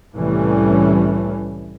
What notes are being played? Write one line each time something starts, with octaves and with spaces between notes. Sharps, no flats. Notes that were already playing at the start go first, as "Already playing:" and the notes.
C2 A2 E3 G3 A3 C#4